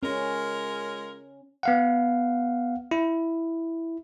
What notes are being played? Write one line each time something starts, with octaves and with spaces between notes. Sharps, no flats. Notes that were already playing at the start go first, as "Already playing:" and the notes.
G#3 C#4 F4 A#4
B3 F5 F#5
E4